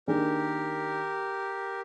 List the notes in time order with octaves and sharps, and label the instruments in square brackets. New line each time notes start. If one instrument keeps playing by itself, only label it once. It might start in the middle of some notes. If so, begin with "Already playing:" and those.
[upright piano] D#3 A#3 D4 G#4 [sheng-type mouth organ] G4 A#4